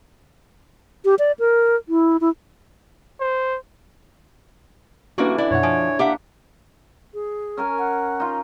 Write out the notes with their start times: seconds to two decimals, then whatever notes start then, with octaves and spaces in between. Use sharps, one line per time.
1.05 G4
1.19 D5
1.39 A#4
1.89 E4
2.21 E4
3.20 C5
5.18 D3 E3 G3 A#3 C#4 D4 F#4 B4
5.38 E4 D5
5.51 F#2 B2 C#5 F#5
5.63 F3 G#5 D7
5.99 A#3 D4 G4 E5 F#5
7.14 G#4
7.57 C#4 A#4 G#5
7.79 F#5
8.20 D#4 F4